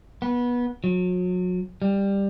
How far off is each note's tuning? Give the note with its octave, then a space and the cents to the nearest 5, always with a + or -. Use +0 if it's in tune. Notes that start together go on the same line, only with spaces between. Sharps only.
B3 -20
F#3 -35
G3 +15